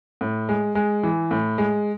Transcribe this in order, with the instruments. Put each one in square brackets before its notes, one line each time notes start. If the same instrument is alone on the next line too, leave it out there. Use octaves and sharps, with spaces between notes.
[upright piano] A2
G#3
G#3
E3
A2
G#3